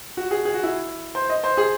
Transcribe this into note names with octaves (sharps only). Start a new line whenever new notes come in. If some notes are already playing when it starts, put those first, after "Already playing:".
F#4
G#4
G#4
F#4
E4
C5
D#5
C5
G#4